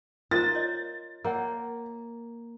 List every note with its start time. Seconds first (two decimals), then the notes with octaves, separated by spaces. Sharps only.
0.31 F4 A#4 C5 A#5 A6
0.55 C#5 D#5
1.24 A#3 A#4 C#5 F#5